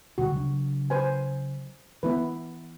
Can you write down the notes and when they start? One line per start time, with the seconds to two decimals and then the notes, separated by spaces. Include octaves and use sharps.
0.18 D2 B2 G3 F#4
0.32 C#3 F#3 D4
0.90 B4 C5 G#5
2.03 E3 B3 E4 B4